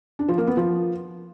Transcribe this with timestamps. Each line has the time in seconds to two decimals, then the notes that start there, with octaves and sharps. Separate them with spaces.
0.19 D4
0.29 F3
0.38 A#3
0.47 B3
0.57 F3